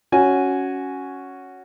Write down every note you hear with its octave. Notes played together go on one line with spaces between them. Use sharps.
C#4 F#4 G#5